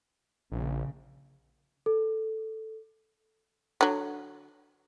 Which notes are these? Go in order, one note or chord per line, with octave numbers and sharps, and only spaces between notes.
A#1 C#3
A4
D3 F#3